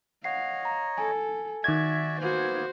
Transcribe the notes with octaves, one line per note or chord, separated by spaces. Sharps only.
C#5 D#5 F5 F#5 C7
A#5
A4 G#5
D#3 F#4 D5 E5 G#6
A#3 B3 F#4 C5